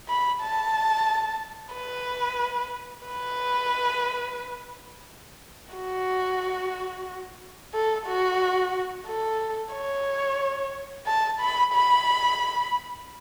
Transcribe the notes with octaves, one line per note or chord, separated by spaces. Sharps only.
B5
A5
B4
B4
F#4
A4
F#4
A4
C#5
A5
B5
B5